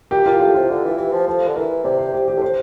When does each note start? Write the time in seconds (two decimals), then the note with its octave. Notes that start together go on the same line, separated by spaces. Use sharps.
0.11 A#2 G4
0.26 A#2 F4
0.40 A2 G4
0.54 C3 F4
0.70 D3 G4
0.84 E3
0.97 E3 G4
1.12 F3
1.27 F3 A4
1.47 D3
1.56 E3 A#4
1.84 C3 D5
1.99 C5
2.13 G4
2.28 G4
2.37 A2
2.42 C5